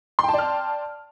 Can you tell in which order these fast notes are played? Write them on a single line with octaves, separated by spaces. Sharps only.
C6 G5 A5 D5 F6